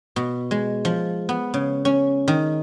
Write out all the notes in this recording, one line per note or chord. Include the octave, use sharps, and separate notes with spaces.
B2
G#3
F3
B3
C#3
C#4
D#3